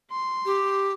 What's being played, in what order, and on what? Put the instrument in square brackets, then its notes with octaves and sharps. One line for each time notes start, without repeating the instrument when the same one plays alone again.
[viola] C6
[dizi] G4